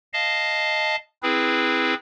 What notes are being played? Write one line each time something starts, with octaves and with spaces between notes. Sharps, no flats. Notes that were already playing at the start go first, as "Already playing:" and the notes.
D#5 F5 A5
C4 E4 G#4 B4